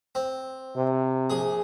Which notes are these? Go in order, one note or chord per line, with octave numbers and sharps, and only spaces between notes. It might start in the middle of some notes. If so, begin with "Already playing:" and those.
C4
C3
A#1 G#4